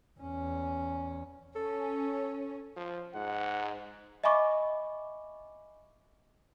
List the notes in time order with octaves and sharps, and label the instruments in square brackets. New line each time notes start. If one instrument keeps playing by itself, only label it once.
[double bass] E2 C#4
[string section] C#4 [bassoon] A4
[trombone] F3
[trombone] G#2 [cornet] F#5
[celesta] D#5 E5 G#5 B5 C#6 D6